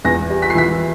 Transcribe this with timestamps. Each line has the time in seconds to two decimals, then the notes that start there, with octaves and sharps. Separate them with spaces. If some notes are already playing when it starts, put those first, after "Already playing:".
0.05 E2 A#6
0.30 G3
0.42 B6
0.50 C7
0.55 E3 B6